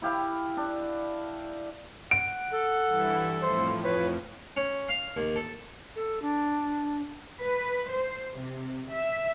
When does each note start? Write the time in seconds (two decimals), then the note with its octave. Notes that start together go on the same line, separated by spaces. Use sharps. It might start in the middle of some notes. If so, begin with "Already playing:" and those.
0.02 E4 G4 F5 B5
0.57 D4
2.11 F#5 D7
2.52 A4
2.87 G2 E3 E4
3.42 F2 A2 F3 C5
3.83 B4 C#5
4.57 C#4
4.89 F5
5.17 D#2
5.36 A4
5.96 A4
6.22 D4
7.40 B4
7.92 C5
8.39 C3
8.93 E5